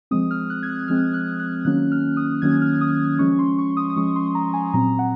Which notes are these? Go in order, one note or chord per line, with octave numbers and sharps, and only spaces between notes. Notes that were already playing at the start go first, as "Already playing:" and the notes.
F3 G#3 C4 D#6
F6
F#6
G#6
F#6
F3 G#3 C4 F6
F#6
F#6
D#3 F#3 A#3 C#4 F#6
F6
D#6
D#3 F#3 A#3 C#4 G#6
F6
D#6
F3 G#3 C#4 C#6
C6
C#6
D#6
D#6
F3 G#3 C#4 C#6
C6
A#5
G#5
A#2 F#3 C4 A#5
F#5